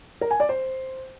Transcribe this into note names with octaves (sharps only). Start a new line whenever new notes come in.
A#4
G#5
D5
C5